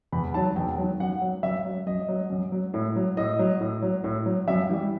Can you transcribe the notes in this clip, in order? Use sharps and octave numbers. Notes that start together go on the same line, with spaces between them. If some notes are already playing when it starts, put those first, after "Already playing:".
E2 B5
D#3 F#3 A5
E2 G5
D#3 F#3
F#2 F#5
F#3
F#2 E5
F#3
F#2 D#5
F#3
F#2
F#3
A2
F#3
A2 D#5
F#3
A2
F#3
A2
F#3
F#2 E5
E3 G3